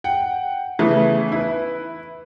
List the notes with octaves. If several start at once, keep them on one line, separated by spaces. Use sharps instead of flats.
F#5 G5
C#3 E3 A3 B3
E4 B4